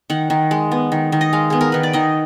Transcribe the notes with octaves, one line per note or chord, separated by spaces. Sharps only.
D#3 F#5
D#3
G#3
B3
D#3
D#3
D#5
G#3 F5
B3 G#4
A#4
D#3 B4
D5
D#3 D#5